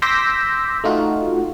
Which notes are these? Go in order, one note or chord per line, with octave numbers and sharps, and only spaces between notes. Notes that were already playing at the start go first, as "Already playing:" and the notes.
C6 D6 E6 G6 A#6 B6
A3 D#4 F4 F#4